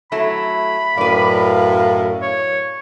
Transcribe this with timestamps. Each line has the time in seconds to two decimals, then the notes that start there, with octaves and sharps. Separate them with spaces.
0.12 F#3 A3 E4 B5
0.97 F#2 A2 B4 D5 F5
2.22 C#5